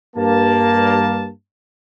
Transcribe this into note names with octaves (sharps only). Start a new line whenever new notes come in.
G2 A#3 A5